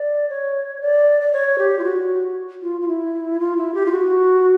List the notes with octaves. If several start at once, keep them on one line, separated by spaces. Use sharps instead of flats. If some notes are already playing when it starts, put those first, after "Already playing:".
Already playing: D5
C#5
D5
D5
C#5
G4
F4
F#4
F4
F4
E4
F4
E4
G4
F4
F#4